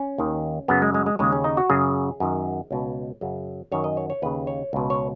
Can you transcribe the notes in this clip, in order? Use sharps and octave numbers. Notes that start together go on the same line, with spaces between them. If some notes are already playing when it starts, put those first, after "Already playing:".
Already playing: C#4
D#2 D#3
F#2 C#3 B3
G#3
G#3
G#3
D#2 C#3 G#3
C#4
D#4
F#4
F#2 C#3 G#4
F#2 D#3
C#2 B2
F#2 C#3
F#2 D#3 C#5
D#5
C#5
C#5
D#2 C#3 B4
C#5
C#2 B2
C#5